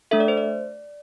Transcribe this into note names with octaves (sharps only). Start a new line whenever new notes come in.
A3 D4 A4 E5
D5
C5
D5